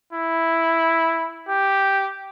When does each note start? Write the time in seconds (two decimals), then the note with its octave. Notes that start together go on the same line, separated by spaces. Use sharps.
0.13 E4
1.49 G4